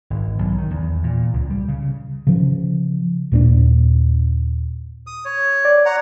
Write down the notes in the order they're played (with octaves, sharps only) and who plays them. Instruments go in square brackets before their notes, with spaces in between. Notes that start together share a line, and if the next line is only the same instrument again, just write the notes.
[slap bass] G#1
B1
D#3
E2
A#2
C#2
G3
C#3
[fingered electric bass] C#3 F3
D#2 A#2 C4 D4
[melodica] D#6
C#5
[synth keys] D5
[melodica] C#5 F#5 A#5